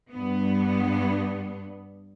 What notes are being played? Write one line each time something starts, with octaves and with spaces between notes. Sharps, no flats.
G2 B3